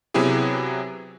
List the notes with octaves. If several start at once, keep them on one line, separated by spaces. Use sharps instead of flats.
C3 F#3 B3 E4 G4 G#4